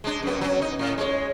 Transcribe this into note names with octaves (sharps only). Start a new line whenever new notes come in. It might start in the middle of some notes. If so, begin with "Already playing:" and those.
G#3 D4
F#2 B3
F#3 C#4
D#4
A2
G#3 C#5